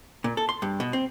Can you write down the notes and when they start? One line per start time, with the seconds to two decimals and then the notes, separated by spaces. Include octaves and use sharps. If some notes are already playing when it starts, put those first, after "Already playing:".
0.24 A#2
0.37 A4
0.49 C6
0.62 G2
0.80 B2
0.93 C4